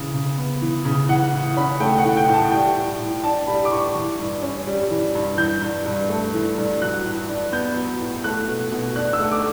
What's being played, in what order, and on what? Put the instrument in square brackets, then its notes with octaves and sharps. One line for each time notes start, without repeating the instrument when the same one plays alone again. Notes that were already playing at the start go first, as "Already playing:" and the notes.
Already playing: [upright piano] C#3 E3
C#3
B3
E3
C#3
E3 F#5
A2
C#4 B5
A3 G5
F#5
E3
G5
A2
A5
G3 G5
A2
A2
D4 A5
G3 B5
D6
A2 C#6
E3
G2
C#4
G3
E3
G2
E3 G6
G2
G2
A3
E3
G2
F#3 F#6
A2
D4
B3 G6
F#3
A2
A3 F#6
B2
B2
D4 F#6
E6
A3
D6